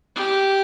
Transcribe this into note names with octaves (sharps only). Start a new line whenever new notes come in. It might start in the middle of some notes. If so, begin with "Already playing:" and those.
G4